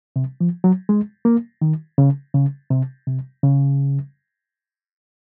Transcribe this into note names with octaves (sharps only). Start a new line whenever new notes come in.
C3
F3
F#3
G#3
A#3
D#3
C#3
C#3
C3
C3
C#3